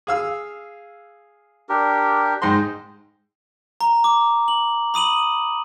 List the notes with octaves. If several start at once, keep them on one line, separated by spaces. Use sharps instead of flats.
G#4 F5 E6
D4 G4 A#4
G#2 C5 D#5 G5 C6
A#5
D6
F#7
B5 D#6 D#7 F#7